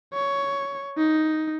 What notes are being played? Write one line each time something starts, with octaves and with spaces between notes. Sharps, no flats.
C#5
D#4